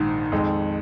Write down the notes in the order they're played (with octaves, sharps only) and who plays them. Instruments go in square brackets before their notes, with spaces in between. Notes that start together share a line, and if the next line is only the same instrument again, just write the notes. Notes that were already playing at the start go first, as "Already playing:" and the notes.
Already playing: [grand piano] A#1 G#2 D#3
F2 D#3 G#3